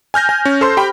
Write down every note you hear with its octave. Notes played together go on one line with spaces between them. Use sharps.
G#5 F6 G6 A#6
G#5
C#4
A4 C5 C6
G4 G5 B5